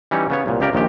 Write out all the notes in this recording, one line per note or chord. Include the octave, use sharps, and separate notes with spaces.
E3 G3 C#4 D#4 C#5
C#3 B3 C#5
C2 A#2
C#2 C#3 G4 A#4 D5
A#1 A#2 D#3 G4